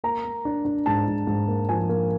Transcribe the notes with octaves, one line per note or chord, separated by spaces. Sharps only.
A#3 A#5
A#3
D4
D4
G#2 A5
G#2
G#2
A#3
F3 G#5
A#3